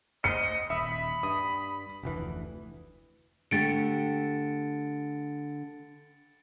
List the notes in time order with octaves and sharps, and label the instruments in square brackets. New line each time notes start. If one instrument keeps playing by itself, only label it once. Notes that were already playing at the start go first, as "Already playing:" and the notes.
[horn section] C5 D#5 [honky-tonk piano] C#7
[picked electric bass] D#1 [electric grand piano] E5 D#6 [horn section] B5
[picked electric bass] G2 [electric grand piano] D#6
[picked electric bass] F1 D2 E3
[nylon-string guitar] D3 A3 G4 [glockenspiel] A6 C#7 D7